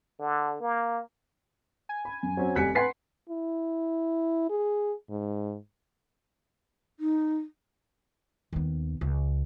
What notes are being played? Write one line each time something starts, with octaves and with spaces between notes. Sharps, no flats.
D3
A#3
G#5
B5
F#2
F#3 C4 C#4
F1 G3 G#5 F#6 B6 C#7
B4 F#5 G#5 C6 A6 B6 C7
E4
G#4
G#2
D#4
D#2 B3
C#2